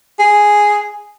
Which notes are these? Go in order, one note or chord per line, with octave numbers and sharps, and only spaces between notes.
G#4